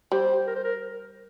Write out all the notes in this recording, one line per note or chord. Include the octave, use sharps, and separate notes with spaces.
G3 C5
A#4
C5
A#4